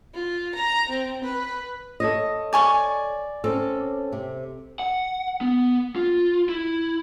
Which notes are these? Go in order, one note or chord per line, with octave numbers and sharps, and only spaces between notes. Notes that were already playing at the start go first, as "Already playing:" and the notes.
F4
A#5
C4
B4
A4 C#5 D#5
D5 G#5 C#6
C4 C#4 A4
C3
F#5
B3
F4
E4